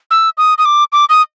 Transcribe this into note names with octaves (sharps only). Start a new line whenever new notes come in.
E6
D#6
D#6
D6
D6
D#6